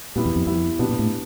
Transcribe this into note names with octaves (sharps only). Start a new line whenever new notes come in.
A#2 G3 B3 E4
E2
F2
F2 G3 B3 E4
B2 G3 B3 D4 G4
A#2
A2